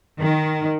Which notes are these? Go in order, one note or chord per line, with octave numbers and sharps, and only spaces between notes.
D#3